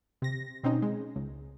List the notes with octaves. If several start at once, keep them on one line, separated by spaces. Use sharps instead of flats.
C3 A#6
B2 C4 C#4 D#4
G#3
C#2